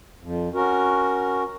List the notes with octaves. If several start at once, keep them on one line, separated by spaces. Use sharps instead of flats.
F2
C#4 F#4 A#4